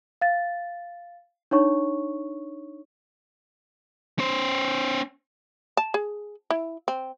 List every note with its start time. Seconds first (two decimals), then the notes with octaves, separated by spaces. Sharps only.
0.21 F5 A6
1.51 D4 D#4 C#5 C#6
4.19 C#4 C5
5.77 A5
5.94 G#4
6.50 E4
6.88 C4